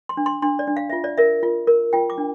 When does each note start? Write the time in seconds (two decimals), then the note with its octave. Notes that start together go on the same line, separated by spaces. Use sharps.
0.09 C6
0.17 D4
0.26 C6
0.42 D4 C6
0.59 D5
0.67 D4
0.77 F5
0.90 F4 E5
1.04 D5
1.18 A#4 E5
1.43 F4
1.67 A#4
1.93 F4 G5
2.10 D6
2.18 D4